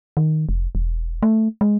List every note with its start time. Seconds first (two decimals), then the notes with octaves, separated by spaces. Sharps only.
0.17 D#3
0.49 F1
0.75 E1
1.23 A3
1.61 G#3